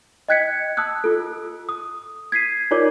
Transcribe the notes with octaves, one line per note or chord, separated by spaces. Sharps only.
D#5 G5 F#6 G#6 B6 C#7
A5 D#6 E6 F#6
F4 A4
D#6
G#6 B6 C7 D#7
D#4 F4 A#4 C#5 D5 D6